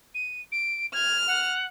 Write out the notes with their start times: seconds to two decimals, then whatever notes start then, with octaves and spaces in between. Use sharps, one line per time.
0.15 D#7
0.52 D7
0.94 F6 G#6
1.27 F#5